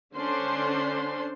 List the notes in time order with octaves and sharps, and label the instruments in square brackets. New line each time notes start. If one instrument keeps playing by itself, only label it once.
[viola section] D3 C#4 D4 C5 C6